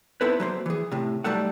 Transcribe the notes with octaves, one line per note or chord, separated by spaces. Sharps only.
B3 C4 D#4 E4 A4 B4
F#3 A#3 C5
E3 G#4
A2 C3
F#3 G3 A3 D#4 A4 F#5